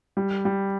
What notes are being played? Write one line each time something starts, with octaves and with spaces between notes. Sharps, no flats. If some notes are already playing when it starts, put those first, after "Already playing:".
G3
G3